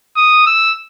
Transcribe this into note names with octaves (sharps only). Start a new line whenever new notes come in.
D#6
E6